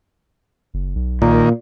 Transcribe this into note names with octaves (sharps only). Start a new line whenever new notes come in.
F#1
B1
A#2 D#3 A#3